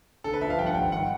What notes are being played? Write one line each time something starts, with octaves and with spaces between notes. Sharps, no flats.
D3 A4
B4
F3 E5
F5
G2 G5
F#5
G#1 G5
D#3 F#5